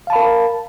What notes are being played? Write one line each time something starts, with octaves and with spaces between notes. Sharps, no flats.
A#4 F5 A5 B5